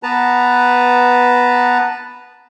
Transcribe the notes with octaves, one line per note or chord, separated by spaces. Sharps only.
B3 B4 A5 A#5